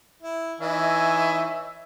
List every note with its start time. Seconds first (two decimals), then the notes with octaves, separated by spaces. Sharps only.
0.22 E4
0.61 E3 D#4 C#5 E5 G#5